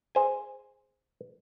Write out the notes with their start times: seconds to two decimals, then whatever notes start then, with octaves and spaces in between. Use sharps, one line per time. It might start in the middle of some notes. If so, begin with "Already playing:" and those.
0.15 G#4 C5 G#5